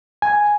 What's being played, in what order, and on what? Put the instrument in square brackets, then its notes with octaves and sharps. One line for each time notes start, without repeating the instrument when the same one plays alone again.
[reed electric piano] G#5